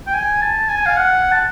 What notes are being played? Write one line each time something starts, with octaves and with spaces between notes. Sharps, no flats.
G5
G#5
A5
G#5
F5
F#5
A5